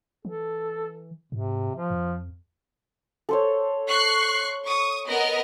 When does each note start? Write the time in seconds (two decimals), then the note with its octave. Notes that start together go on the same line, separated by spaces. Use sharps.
0.25 E3 A4
1.32 G#2 C3
1.75 F3
1.90 F2
3.29 A4 C5 C#5
3.89 C#6 F#6 C7
4.67 C#6 D#6
5.09 B3 A#4 D#5